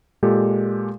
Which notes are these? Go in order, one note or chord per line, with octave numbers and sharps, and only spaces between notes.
A#2 G#3 G4 A4